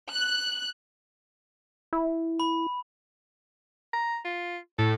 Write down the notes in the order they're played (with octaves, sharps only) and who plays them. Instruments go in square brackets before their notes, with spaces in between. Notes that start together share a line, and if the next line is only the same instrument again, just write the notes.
[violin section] F#6
[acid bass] E4
[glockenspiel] B5
[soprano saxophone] A#5
F4
[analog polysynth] A2 [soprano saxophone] A4